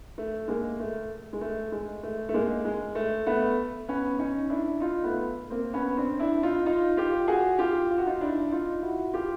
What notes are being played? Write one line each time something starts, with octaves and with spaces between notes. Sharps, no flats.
A3
G#3 A#3
A3
G#3
A3
G#3
A3
A3
G#3 A#3
G#3
A3
A3 B3
B3 C#4
C#4 D#4
D4 E4
D#4 F4
A3 B3
A#3 C4
B3 C#4
C4 D4
D4 E4
D#4 F4
D#4 F4
F4 G4
F#4 G#4
F4 G4
F4
F#4
D#4 F4
D4 E4
D#4 F4
E4 F#4
F4 G4